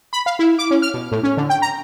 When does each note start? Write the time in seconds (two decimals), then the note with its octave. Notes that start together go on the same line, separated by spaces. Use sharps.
0.13 B5
0.26 F5
0.39 E4
0.59 D6
0.71 C#4
0.82 F6
0.94 B2
1.12 A2
1.23 C#4
1.37 D3
1.50 G5
1.62 A#5